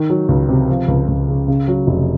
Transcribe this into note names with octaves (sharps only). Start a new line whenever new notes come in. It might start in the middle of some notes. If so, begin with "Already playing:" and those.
Already playing: D#3
F#3
C#2
C3
F3
C#2
C#2
C#3
C#3
F#3
F1